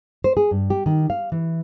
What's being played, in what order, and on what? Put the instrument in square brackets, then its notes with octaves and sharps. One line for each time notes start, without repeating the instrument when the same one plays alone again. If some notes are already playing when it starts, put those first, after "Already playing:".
[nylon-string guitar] C5
G#4
G2
G4
D#3
F5
E3